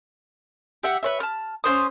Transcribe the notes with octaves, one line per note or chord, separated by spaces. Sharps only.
G4 E5 F#5
B4 C#5 E5
A5 F6
C#4 F4 C5 D#6